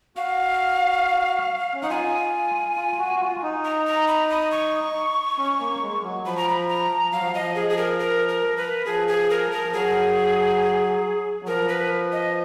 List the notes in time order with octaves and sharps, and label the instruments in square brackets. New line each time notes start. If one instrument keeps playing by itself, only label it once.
[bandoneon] F#4 [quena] F5
[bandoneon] C#4
[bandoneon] D#4 [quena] F#5
[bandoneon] F4 [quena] G#5
[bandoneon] F4
F#4
F#4
F4
D#4
[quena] A#5
A#5
B5
D#6
C#6
[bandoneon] C#4
A#3
G#3
F#3
[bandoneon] F3 [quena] B5
[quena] A#5
B5
A#5
[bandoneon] F#3 [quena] F5
[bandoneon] F3
[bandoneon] F3 [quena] D#5
[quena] G#4
G#4
A#4
A#4
A#4
B4
[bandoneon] F3 [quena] G#4
[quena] G#4
A#4
A#4
[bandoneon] F3
[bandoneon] F#3 [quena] G#4
[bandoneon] F#3
[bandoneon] F3 [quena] A#4
[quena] B4
D#5